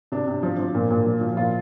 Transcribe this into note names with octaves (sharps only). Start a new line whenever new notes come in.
C3 D4
C3
F3
F3
A#2
A#2
F3
F3
A#2 F4